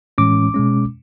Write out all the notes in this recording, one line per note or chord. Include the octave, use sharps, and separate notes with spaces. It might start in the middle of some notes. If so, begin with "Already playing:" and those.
A2 E3 G#3 C#4 D6
B2 G#3 C#4